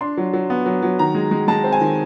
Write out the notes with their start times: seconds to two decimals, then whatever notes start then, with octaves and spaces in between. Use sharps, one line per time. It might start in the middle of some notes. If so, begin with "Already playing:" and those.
0.01 D4 C6
0.17 F#3
0.33 F#3
0.50 B3
0.66 F#3
0.82 F#3
0.99 D#3 A#5
1.15 G#3
1.31 G#3
1.48 G#3 A5
1.64 C4
1.73 G#5
1.81 D#3